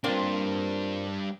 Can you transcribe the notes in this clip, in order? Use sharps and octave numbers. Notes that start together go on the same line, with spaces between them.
G3 A#3 C4 D4 F4